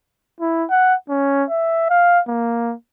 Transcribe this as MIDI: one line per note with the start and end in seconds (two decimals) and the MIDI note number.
0.40 0.65 64
0.70 0.94 78
1.09 1.44 61
1.50 1.89 76
1.90 2.20 77
2.28 2.75 58